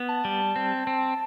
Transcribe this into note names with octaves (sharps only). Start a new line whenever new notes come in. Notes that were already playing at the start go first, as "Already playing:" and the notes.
Already playing: B3
A5
G3
C4
C4